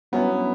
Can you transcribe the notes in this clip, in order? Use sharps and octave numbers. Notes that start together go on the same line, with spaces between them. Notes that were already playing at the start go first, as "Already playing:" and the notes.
G2 F#3 B3 C#4 E4